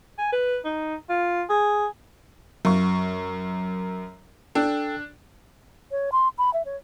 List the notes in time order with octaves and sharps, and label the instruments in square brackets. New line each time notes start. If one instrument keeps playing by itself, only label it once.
[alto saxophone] G#5
B4
D#4
F4
G#4
[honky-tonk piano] F#2 C#6 [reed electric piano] F#3
[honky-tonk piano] D4 [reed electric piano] A4 G5 E6
[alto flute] C#5
C6
B5
E5
C#5